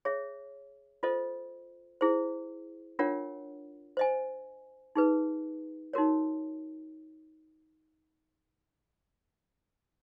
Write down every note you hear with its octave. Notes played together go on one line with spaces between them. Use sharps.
G#4 C#5 E5
F4 A4 C5 D#5
E4 G#4 C5
D4 F4 A#4 C#5 F#5
C5 D#5 G#5
D#4 G#4 B4
D#4 F#4 A#4 C#5